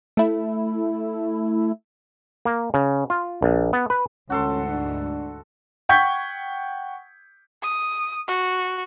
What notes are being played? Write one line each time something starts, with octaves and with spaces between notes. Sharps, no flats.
A3 E4
A#3
C#3
F4
A#1
B3
B4
D2 G#2 E3 C#4 F#4 A4 C6
D4
F#5 G5 C#6 G6 G#6 B6
D#6
F#4